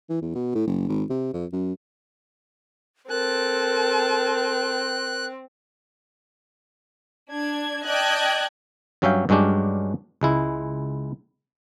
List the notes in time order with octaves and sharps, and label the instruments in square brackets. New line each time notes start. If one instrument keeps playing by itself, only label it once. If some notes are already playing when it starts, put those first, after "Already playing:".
[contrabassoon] E3
E2
B2
A2
F#1
G#1
C3
F2
F#2
[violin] C4 [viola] A4 A5 [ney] A#4 [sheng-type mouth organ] F#6
[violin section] D4 G#6
D5 D#5 G5 A5 F#6 G#6
[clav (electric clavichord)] G2 F#3 C#4 E5 F5 G5
G2 F#3 G#3 C#4 D4 G4
C#2 G#3 E4